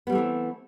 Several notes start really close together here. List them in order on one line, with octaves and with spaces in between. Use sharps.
B3 G3 A3 E3 C4